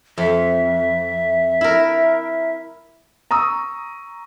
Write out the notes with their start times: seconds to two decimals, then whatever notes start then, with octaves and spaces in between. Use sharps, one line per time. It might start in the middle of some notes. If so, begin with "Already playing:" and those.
0.18 F2 E5
1.61 E4 A#4
3.31 A#5 C#6 D#6 E6